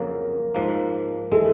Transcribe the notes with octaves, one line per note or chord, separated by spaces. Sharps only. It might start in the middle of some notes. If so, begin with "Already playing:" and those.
Already playing: F2 C#3 F#3 A#3 A#4
G#2 F3 A#3
E3 G#3 A4